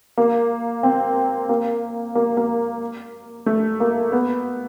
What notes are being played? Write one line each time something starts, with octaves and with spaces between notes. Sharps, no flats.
A#3
C4
A#3
A#3
A#3
A3
A#3
B3